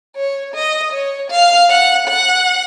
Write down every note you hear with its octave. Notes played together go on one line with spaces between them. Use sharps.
C#5
D#5
C#5
F5
F#5
F#5